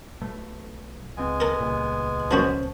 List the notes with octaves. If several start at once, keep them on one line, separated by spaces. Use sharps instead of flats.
B1 A3
C#2 G#3 B3 C4 G#5
A4 A#4
D#1 C#2 A#2
F3 A#3 C#4 F#4 C5 A5